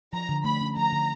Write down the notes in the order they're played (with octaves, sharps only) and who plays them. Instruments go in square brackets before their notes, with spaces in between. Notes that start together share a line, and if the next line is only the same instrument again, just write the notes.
[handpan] F3 [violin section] A#5
[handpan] D3
[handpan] A3 [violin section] B5
[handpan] C#4
[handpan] F3 [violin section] A#5
[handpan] D3